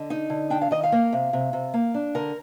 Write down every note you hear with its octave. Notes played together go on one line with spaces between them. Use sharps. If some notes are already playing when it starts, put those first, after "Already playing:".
Already playing: D3 D#5
D#4
D3
D4 G5
F5
D#3 D#5
F5
A#3
C3
C3
C3
A#3
D4
D3 A#4